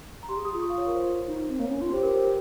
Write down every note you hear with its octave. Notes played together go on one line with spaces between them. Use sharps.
A#5
G4 C6
G#4
G4 D#6
F4
C#6
F5
C#5
A#4
C5
D#4
C4
A#3 C#5
C4
C#4
F4
G4 C5
A#4
C5